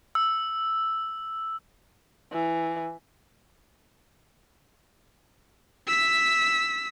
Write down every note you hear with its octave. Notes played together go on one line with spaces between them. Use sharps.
E6
E3
E6 B6